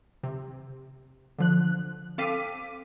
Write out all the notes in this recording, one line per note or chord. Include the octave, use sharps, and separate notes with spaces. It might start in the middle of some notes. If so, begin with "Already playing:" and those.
C3
D3 F3 F#6
C4 A4 F5 D6 B6 D#7